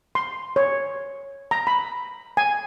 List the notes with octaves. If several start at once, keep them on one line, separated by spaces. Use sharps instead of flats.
C6
C#5
A#5
B5
G#5